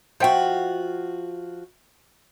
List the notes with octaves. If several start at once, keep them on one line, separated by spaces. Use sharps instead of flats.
F3 F#4 C5 E5 G5